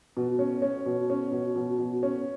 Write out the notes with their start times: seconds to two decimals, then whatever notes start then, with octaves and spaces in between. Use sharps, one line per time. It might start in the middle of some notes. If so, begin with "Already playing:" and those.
0.17 B2
0.39 C#4
0.62 C#4
0.86 B2
1.10 C#4
1.32 B2
1.56 B2
1.79 B2
2.03 C#4